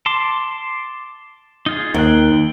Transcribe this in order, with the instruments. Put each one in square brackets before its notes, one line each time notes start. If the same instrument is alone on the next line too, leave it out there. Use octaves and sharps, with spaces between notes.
[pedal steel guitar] A5 C6 D6
D#4 F4 G#4
[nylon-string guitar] D#2 [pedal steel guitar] D#3 G5 F#6